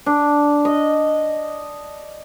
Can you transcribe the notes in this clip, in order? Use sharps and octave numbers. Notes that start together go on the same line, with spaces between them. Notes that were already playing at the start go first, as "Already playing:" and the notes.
D4
D#5